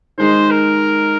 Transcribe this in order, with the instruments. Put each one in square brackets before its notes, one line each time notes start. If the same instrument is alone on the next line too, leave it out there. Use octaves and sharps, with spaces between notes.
[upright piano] D#3 G#3 D#4 [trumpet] C5
[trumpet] A#4